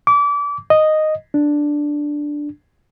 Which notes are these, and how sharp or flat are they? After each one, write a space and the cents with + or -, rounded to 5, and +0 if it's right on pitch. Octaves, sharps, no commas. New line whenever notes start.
D6 -30
D#5 -5
D4 +0